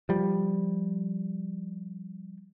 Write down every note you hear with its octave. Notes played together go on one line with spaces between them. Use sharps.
F3 G3